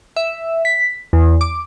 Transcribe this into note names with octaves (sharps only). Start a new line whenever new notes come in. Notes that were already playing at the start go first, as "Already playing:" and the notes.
E5
B6
E2
D6